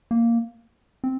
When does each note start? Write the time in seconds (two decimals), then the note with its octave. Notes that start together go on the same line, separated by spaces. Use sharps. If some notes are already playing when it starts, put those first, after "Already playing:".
0.11 A#3
1.04 C4